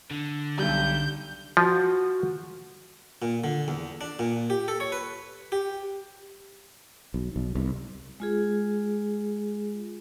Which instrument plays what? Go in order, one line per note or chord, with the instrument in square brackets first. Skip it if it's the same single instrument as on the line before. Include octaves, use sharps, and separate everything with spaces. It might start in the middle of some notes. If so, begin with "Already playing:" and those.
[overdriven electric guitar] D3
[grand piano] B1 G3 [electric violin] G6
[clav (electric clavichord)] F3 [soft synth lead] F#4
[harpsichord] A#2
D3
E2
D4
A#2
G4
A4
C#5
B4
G4
[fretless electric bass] B1
B1
C2
[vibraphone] G#3 F4 G#4